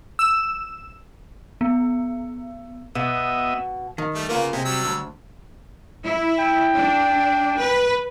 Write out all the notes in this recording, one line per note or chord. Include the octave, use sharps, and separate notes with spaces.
E6 E7
B3
B2 B3 D#5 E5
D#3
G3 A3
C#3 A#3 B3 F4 A#4
C3 G#3
F#3 G3 E6
D2
E4
G5
D4
B4